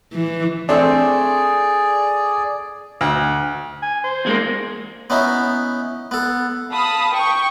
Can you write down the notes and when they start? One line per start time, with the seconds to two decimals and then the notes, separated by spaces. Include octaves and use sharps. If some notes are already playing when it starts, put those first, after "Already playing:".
0.13 E3
0.69 A3 C4 D4 G#4 D5
3.01 D2
3.82 G#5
4.04 C5
4.25 E2 G#3 A#3
5.10 B3 C#4 D#4 E4
6.11 B3 A4
6.72 F5 A5 B5 D#6
7.12 G5 C#6